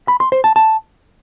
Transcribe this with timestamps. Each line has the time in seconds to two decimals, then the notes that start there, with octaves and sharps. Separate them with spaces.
0.08 B5
0.20 C6
0.32 C5
0.44 A5
0.56 A5